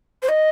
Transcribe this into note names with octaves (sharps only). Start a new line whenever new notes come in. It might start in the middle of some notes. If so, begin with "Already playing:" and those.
C5
D#5